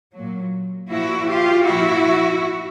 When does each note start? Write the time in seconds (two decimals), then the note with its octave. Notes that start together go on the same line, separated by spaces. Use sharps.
0.14 A#2 F#3
0.89 A#2 F3 E4 F#4
1.27 F4 G4
1.65 A#2 F3 E4 F#4